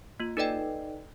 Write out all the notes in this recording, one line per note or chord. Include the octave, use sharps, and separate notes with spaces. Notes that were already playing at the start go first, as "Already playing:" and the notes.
A#3 F4
D#4 A4 B4 D5 D#5 G5